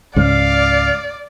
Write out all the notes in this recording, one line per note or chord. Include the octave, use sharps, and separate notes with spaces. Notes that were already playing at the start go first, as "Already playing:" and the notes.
C#2 G#2 C#3 D5 F5